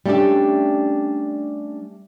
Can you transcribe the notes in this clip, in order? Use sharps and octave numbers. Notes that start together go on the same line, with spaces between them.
G3 A3 C#4 D4 G4